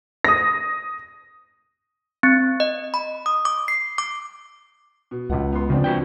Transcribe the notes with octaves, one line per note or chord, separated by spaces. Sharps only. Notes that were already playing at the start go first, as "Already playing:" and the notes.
D#6 A#6
C4
D#5
B5
D#6
D6
C7
D6
B2
C#2 C#3 F#5
B3 C6
C#3 F3 C4 D4
F#4 B4 G5